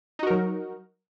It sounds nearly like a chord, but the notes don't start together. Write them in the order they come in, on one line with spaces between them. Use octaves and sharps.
D#4 F#4 A#4 F#3